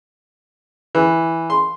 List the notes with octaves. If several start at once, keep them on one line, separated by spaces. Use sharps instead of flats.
E3
C6